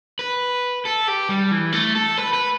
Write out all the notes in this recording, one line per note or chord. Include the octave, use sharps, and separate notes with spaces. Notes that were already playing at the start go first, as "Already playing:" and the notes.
B4
A4
G4
G3
E3
A3
A4
B4
B4